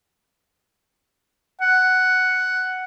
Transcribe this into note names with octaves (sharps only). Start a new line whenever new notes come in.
F#5